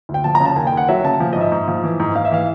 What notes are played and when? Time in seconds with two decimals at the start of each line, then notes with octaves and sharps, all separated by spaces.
0.09 D2
0.14 G5
0.24 F3 A5
0.35 A#5
0.40 C#3
0.45 A5
0.56 D#2 G#5
0.67 G5
0.72 D#2
0.77 F#5
0.88 F#3 E5
1.04 C#3 A5
1.19 F3 G#5
1.33 G#2 D#5
1.41 E5
1.52 G#2
1.68 F3
1.84 E3
2.00 G#2
2.15 G#2 F5
2.25 E5
2.31 E3 F5